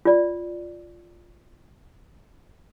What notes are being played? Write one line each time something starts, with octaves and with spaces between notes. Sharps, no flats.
F4 D5